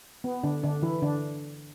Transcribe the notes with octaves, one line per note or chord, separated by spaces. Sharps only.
B3
D3 D4
D3 D4
E3 E4
D3 D4